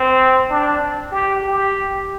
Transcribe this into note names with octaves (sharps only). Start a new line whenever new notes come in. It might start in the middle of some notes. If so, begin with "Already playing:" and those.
Already playing: C4
D4
G4
G4